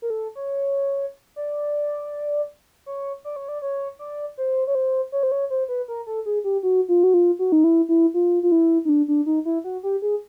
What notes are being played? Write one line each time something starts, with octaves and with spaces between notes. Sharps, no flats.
A#4
A4
C#5
D5
C#5
D5
C#5
D5
C#5
D5
C5
C#5
C5
C#5
C5
C#5
C5
B4
A#4
A4
G#4
G4
F#4
F4
F#4
F4
F#4
D#4
E4
E4
F4
F4
E4
D#4
D4
D4
D#4
E4
F#4
G4
G#4